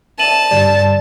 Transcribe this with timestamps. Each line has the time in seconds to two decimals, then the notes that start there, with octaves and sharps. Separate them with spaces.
0.19 D5 E5 A5 D#7 E7 F#7
0.51 G2 D3 G3 D5